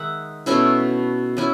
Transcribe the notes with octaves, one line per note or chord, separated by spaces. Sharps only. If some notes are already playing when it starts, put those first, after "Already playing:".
Already playing: D#3 G#3 D#4 E5 F#5
B2 A3 C#4 E4
F#3 C#4 E4